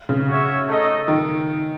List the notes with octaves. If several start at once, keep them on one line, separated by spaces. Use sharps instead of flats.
C#3
F#4 C#5 E5
A3 D#4 A4 D#5
D#3